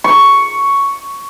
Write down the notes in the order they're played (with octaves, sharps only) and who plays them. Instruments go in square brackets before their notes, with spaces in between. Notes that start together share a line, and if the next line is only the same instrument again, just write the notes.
[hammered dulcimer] C#6